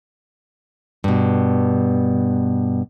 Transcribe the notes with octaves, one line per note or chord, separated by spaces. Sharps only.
G2 B2